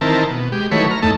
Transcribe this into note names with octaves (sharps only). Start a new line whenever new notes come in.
D#3 E3 C4 A#4 A5
B2
G#3 G4
D#3 E3 F#3 A3 B4 C#5
A#5 F6
E2 A2 A3 D#4 A5